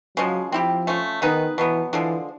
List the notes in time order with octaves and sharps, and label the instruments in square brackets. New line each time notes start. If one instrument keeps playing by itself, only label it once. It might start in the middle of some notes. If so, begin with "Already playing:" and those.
[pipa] C#3 F3 G#3 [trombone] F#3
[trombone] F3 [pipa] C4 E4 G4
[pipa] A3 C#4 F4
[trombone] D#3 [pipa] B3 D#4 G#4 B4
[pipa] B2 F#3 B3 [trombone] E3
[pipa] D3 F3 G#3 [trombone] E3